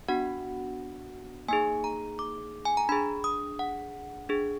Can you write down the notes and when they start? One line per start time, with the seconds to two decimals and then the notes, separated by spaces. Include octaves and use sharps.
0.08 B3 D4 F#4 F#5
1.49 A#3 D#4 G#4 G#5
1.84 A#5
2.19 D6
2.65 G#5
2.77 A#5
2.89 D4 G#4 B5
3.24 D#6
3.59 F#5
4.29 D4 G#4